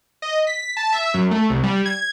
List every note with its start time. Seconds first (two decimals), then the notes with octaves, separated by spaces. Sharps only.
0.22 D#5
0.47 B6
0.77 A5
0.93 E5
1.14 F#2
1.31 A3
1.50 C2
1.63 G3
1.85 G#6